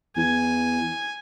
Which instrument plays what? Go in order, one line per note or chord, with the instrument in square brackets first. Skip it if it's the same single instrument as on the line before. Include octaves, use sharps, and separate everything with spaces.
[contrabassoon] E2 [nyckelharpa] G#5